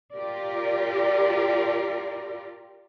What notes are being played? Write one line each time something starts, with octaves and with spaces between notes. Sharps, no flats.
F4 G4 A#4 D5